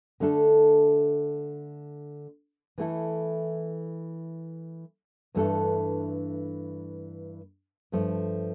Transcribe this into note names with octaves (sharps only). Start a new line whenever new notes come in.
D3 A3 D4 A4
E3 A3 E4 A4
G2 E3 A3 D4 A4
G2 F3 A3